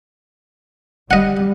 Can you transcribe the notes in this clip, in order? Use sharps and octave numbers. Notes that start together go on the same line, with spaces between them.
G3 D#5 F#5